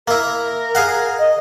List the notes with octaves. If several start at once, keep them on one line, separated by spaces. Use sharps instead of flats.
A#3 E4 A#4
G#4 F5 F#5
D#5